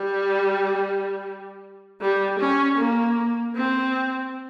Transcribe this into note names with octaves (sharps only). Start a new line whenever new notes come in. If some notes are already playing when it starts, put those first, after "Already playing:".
Already playing: G3
G3
C#4
A#3
C4